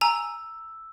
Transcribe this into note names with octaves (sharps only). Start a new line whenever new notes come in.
G#5 A#5 E6